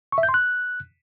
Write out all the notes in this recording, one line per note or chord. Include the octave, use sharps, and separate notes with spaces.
C#6
E5
G6
C6
F#6